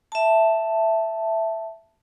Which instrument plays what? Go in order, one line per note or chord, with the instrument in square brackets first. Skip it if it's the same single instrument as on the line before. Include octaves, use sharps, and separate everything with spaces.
[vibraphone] E5 A5